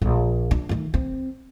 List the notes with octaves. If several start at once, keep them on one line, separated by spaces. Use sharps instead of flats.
A#1
D4
D#3 A3
C4